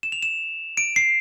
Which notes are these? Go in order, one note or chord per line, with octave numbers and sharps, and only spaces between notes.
E7
F7
E7
D7
C7